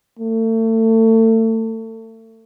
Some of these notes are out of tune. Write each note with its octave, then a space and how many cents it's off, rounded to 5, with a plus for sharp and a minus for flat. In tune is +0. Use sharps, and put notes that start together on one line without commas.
A3 +35